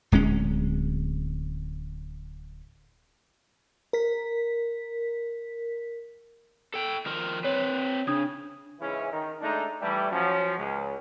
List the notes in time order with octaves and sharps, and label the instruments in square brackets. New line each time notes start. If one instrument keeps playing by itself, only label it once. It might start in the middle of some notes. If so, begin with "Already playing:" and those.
[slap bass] D1 G#3 C#4
[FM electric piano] A#4 B6
[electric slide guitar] A4 G5
D#3 F3 A#4
[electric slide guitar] C4 B4 [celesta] C#5
[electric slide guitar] C#3 [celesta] D4 D#6 G#6
[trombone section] G#2 C#3 E3 G#3 C#4 E4
D#3
G#3 A3 D4 D#4
E3 G3 A3
F3 F#3 C#4
C#2